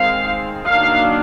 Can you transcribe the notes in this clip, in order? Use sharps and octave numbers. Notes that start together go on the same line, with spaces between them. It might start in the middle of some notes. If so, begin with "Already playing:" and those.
Already playing: D#3 G#3 C4 F5
D#3 F#3 A#3 D4 F5